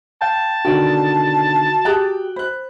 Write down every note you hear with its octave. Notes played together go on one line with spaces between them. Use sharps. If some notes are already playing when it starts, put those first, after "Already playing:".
F5 G5 A5 G6
B2 D3 D#3 F#4 D5 G5
G4 G#4 G5 A#5 F#6
C5 B5 F#6